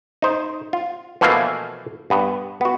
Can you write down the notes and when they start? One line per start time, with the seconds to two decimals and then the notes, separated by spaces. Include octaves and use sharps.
0.22 D#4 C5
0.73 F4
1.21 B2 E3 F3 A3 A#3 F5
2.10 G2 B3
2.61 B3 F#4